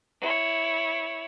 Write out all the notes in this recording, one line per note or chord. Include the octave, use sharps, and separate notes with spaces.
E4 C#5